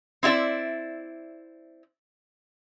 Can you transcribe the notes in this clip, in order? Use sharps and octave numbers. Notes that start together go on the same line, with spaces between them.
C4 E4 F4 D5 E5